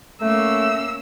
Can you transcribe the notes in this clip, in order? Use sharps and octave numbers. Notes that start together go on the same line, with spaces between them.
A3 A#3 C#4 E6